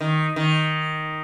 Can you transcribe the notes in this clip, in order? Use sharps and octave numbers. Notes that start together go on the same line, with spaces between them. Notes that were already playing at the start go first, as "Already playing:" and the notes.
D#3
D#3